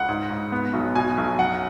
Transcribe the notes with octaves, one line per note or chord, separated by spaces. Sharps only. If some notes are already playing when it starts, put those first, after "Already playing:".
Already playing: C#2 F#5
G#2
G#2
B3
B1
B2 G#5
B1
F#2 F#5